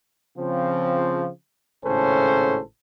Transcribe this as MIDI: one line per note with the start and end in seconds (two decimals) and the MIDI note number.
0.37 1.28 49
0.37 1.28 53
0.37 1.28 60
1.85 2.60 32
1.85 2.60 45
1.85 2.60 49
1.85 2.60 61
1.85 2.60 69
1.85 2.60 72